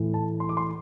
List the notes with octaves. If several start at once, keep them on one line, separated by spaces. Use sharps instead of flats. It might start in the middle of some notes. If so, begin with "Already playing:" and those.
Already playing: A2 E3 A3
A5
C6
D6
C6